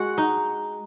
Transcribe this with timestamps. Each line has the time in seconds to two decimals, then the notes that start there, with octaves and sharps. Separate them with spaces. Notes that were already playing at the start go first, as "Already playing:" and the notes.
Already playing: G#3 F#4 F#5
0.18 D#4